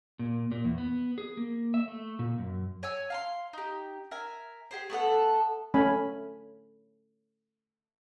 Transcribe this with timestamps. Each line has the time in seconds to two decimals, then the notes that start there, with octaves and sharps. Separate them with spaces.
0.19 A#2
0.52 A#2
0.65 E2
0.78 B3
1.18 G#4
1.37 A#3
1.74 E5
1.88 A3
2.19 A#2
2.38 F#2
2.83 C#5 G#5 E6
3.10 F5 A5 C6
3.53 D#4 G4
4.11 A#4 E5 G#5
4.71 G4 G#4 C5
4.90 A3 B3 A4 F#5
5.74 A3 C#4 G#5 B5